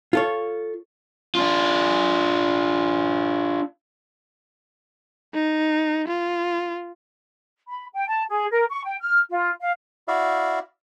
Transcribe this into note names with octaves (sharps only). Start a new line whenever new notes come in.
F4 A4 C#5
D4 F4
D#4
F4
B5
G5
A5
G#4
A#4
C#6
G5
F6
F4
F5
E4 F#4 D5 E5 F5